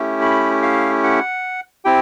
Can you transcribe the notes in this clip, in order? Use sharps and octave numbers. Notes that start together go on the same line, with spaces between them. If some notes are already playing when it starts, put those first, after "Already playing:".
Already playing: A3 C#4 E4 G4
B5
F5
F#5
C4 E4 G4 G5